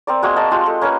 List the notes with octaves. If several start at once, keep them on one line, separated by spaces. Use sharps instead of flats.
C4 A#4 D5
G#3 A#3 F#4
D#5 A5
G#3 F4 G4
A4
A#3 C#4 A#4 B4